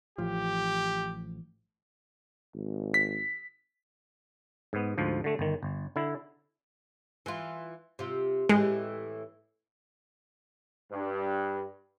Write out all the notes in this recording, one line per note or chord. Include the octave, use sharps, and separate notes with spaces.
A1 F3 G4
G#1
B6
G#2 B3
D2 G#2 F3
D3 A3
G1 D#3
G1
D3 E4
E3 F4
C3 F4
A2 E3 G#3 G4
G2